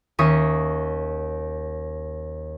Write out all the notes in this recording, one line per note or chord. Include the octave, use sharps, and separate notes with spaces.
D#2 C#4 E5 C#6 D#6